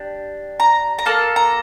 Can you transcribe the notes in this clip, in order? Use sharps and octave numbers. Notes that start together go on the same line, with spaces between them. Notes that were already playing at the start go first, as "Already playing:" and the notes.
Already playing: D4 G4
A#5
A#5
A#3 F4 A4 A5
A#5